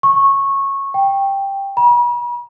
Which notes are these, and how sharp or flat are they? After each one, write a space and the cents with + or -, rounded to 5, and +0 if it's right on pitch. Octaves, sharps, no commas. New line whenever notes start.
C#6 -15
G5 +5
B5 -45